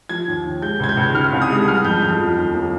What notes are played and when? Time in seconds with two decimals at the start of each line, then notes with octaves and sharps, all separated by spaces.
0.09 F3 G#6
0.28 D#2
0.44 D#2
0.62 G#3 G6
0.80 C#2 G#6
0.89 G6
0.97 C#2
1.14 D#3 F6
1.32 C2
1.42 D#6
1.50 G#3
1.68 G3 F6
1.84 F2 G6
2.02 F2 G6
2.20 F3
2.37 D#2
2.55 A#3